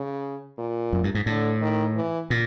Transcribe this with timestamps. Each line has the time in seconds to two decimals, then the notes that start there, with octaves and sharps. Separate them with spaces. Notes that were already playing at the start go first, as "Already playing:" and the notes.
Already playing: C#3
0.58 A#2
0.93 F#2
1.04 G2
1.15 G#2
1.26 A2 D3
1.61 D#3
1.95 E3
2.30 A#2